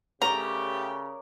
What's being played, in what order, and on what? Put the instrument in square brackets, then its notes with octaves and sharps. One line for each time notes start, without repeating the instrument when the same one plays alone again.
[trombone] C#3 [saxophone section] A3 B3 G4 [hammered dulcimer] A#4 C#5 D5 [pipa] A#5